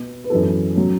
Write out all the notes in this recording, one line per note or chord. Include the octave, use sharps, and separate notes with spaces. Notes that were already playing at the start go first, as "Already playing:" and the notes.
Already playing: B2 B3
B4
F#2 E3 B3 A4
F#3 C#4